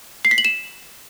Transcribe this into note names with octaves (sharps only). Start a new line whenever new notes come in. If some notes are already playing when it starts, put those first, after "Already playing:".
C7
B6
F#7
E7